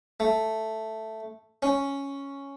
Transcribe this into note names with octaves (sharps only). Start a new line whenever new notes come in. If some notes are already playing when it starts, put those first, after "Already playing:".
A3
C#4